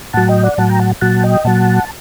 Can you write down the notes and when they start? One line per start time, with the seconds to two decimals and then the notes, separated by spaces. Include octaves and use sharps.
0.13 A2 F#3 F#5 A5
0.28 D#5 G5
0.43 D5 F#5
0.58 A2 F#3 F#5 A5
0.68 G5 A#5
0.79 F#5 A5
1.01 A#2 F#3 F#5 A5
1.23 D#5 G5
1.45 A#2 F#3 F#5 A5